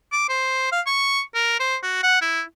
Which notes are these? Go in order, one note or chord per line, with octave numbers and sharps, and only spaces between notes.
D6
C5
F5
C#6
A#4
C5
F#4
F#5
E4